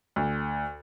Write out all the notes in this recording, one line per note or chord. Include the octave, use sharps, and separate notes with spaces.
D2